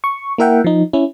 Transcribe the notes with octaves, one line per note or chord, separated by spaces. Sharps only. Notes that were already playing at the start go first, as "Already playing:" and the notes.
C#6
A#3 E4 A#4 E5 F#5 G5
F3 D#4
C#4 E4